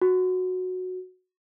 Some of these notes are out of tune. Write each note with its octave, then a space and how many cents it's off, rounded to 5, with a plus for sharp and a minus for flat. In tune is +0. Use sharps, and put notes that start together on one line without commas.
F#4 -10